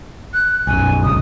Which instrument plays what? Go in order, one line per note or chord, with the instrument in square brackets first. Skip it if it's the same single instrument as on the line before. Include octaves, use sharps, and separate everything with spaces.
[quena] F#6
[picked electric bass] B1 F#2 [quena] G#5
[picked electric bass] G1 C#2 [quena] D#6